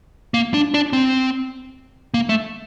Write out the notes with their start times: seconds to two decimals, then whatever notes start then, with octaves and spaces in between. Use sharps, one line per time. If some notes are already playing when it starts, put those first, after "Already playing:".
0.34 A#3
0.54 D4
0.74 D4
0.93 C4
2.14 A#3
2.29 A3